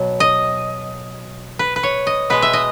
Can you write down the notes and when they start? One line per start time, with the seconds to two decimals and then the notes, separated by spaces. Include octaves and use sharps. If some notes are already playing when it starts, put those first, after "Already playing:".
Already playing: B2 F#3
0.20 D#5
1.59 B4
1.76 B4
1.83 C#5
2.07 D#5
2.30 B2 G#3 B4
2.42 E5
2.53 D#5